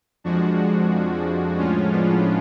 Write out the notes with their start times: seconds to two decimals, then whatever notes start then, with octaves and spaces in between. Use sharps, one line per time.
0.24 F2 F3 G#3 D4 F#4
1.58 A2 F3 G#3 C#4 F4
1.92 B3 D4